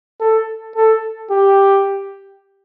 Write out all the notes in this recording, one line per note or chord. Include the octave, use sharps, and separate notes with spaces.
A4
A4
G4